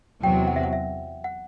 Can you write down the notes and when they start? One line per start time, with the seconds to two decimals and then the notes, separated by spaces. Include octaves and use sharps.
0.22 E2 C3 F#3 G5
0.48 F#5
0.56 E5
0.63 F#5
0.73 E5
1.24 F#5